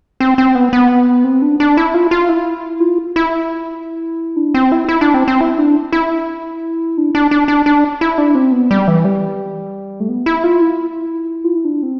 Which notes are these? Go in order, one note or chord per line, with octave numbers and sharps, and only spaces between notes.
C4
C4
B3
B3
C4
D4
D4
E4
F4
F4
E4
F4
E4
D4
C4
E4
E4
D4
C4
C4
E4
D4
E4
D4
D4
D4
D4
D4
E4
D4
C4
B3
G3
E3
G3
A3
B3
E4
F4
E4
F4
E4
D4
C4